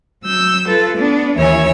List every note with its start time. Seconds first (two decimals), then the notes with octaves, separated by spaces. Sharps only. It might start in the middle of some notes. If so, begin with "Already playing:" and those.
0.23 F#3 E6 G6
0.68 F4 A4 B4
0.96 B3 D4
1.36 D#2 E3 E4 C#5 G#5 E6